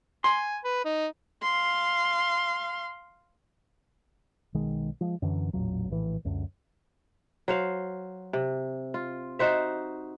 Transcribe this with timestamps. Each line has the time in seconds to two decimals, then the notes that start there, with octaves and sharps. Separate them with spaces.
0.24 G#5 C6
0.64 B4
0.84 D#4
1.43 F5 C6
4.54 B1 D#3 G#3
5.01 F3 G#3
5.22 F#2 D3 E3
5.53 A1 E2 A#2 F#3
5.90 A#1 A2 E3
6.25 C#2 F#2 D3
7.48 F#3 C5 F5
8.33 C3
8.94 F4
9.39 D#4 F#4 C5 E5